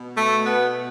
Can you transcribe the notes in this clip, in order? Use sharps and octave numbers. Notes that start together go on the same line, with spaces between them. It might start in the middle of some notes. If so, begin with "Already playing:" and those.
Already playing: B2
A3
B3